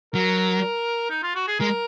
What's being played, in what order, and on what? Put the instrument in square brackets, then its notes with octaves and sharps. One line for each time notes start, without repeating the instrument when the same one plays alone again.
[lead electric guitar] F#3 [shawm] A#4
[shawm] D#4
F4
F#4
G#4
[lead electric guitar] G#3 [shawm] A#4